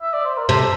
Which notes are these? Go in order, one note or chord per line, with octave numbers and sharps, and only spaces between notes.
E5
D5
C5
A#4
C3 A4